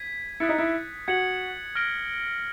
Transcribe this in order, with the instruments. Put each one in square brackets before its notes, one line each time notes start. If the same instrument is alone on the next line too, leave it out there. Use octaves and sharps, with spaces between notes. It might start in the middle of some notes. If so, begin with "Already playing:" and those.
Already playing: [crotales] G#6 B6 D#7
[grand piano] E4 [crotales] D#6 F#6 A6 C#7
[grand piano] D#4
E4
[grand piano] F#4 [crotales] G#6 C#7 F#7
[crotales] F6 A#6 D7 G7